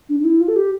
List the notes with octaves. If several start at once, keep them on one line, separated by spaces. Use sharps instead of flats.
D4
D4
E4
F4
A4
G4